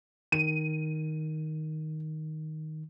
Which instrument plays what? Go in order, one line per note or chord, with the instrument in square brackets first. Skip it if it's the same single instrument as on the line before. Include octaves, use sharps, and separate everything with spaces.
[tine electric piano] D#3 [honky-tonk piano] D#7